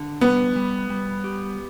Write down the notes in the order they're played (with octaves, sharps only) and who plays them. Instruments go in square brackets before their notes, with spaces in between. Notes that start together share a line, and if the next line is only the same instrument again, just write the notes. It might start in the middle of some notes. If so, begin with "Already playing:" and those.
Already playing: [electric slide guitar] D3
[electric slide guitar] G3 [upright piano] B3
[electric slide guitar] G3
G3
G4